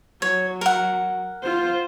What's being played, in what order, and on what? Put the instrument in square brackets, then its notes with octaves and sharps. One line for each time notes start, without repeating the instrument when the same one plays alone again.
[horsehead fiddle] F#3 [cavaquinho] C#5
[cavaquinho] A#4 F#5
[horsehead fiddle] F4 C5